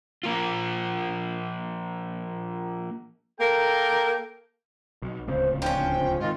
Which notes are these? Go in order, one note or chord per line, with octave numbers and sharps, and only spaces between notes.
F3 A#3 F4
A#3 A4 A#4 G5
B1
D1 C#2 C#3 C5
F3 C#4 D4 G5
G#2 D#3 F4 D#5